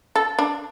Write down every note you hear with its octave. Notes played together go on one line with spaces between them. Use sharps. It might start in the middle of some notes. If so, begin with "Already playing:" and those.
A4
D4